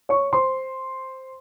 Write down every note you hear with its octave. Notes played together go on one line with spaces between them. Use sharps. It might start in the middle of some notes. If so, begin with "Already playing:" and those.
C#5 C#6
C5 C6